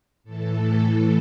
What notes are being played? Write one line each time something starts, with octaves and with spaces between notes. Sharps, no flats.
A2 E3 A4